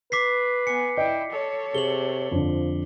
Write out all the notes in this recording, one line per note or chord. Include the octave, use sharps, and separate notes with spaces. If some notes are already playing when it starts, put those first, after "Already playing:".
B4 D6 B6 C7
B3 G#5 C#7
E4 D5 D#5 G5
A4 C#5
C3 G#4 F#7 G7
F2 D3 F3